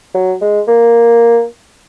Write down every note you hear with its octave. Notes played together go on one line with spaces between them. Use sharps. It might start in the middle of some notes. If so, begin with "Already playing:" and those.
F#3
G#3
A#3